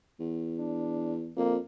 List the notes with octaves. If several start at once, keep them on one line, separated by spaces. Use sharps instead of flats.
E2
D4
F2 A#3